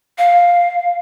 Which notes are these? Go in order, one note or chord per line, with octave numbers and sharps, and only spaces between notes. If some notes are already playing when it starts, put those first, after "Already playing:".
F5